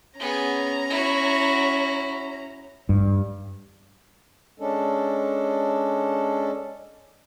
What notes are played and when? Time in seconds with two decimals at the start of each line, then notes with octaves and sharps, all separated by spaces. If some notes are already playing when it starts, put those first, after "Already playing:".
0.19 B3 C#4 G#4 A#5
0.90 E4 F#4
2.89 G2
4.60 G#3 C#4 D4 A4